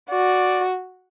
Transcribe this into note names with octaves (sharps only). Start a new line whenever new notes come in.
F#4 D5